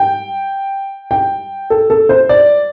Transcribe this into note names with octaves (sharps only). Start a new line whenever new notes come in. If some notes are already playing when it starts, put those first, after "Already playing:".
Already playing: G5
G5
A4
A4
C5
D5